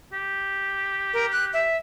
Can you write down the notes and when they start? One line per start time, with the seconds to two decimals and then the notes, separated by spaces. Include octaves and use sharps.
0.13 G4
1.14 A#4
1.32 F#6
1.54 E5